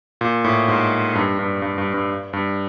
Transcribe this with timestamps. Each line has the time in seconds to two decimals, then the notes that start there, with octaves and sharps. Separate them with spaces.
0.21 A#2
0.44 A2
0.68 G#2
1.15 G2
1.39 G2
1.62 G2
1.78 G2
1.94 G2
2.33 G2